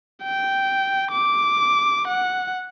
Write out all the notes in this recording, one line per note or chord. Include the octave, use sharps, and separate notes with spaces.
G5
D6
F#5